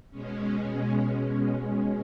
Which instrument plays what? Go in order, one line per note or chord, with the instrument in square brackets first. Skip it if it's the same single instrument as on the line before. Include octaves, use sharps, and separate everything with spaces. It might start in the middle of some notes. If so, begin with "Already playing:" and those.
[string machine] B2 G#3 C#4